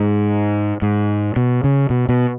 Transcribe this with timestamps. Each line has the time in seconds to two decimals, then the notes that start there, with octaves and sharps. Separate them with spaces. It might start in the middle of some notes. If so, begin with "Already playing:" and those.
Already playing: G#2
0.82 G#2
1.36 B2
1.64 C#3
1.90 B2
2.09 B2